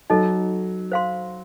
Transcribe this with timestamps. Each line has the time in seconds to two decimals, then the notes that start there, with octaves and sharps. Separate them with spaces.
0.10 F#3 D#4 A4 D#5
0.92 C5 F5 C6